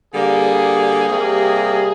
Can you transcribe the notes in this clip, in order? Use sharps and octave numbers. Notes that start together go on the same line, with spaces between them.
D3 G3 A#3 G#4
C3 G3 A#3